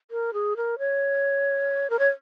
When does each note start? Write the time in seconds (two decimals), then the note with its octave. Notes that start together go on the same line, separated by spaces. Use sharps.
0.11 A#4
0.34 G#4
0.57 A#4
0.79 C#5
1.90 A#4
1.99 C#5